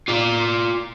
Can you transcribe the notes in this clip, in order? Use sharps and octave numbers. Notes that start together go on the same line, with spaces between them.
F4 D5